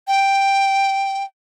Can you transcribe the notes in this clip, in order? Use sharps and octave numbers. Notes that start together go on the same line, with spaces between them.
G5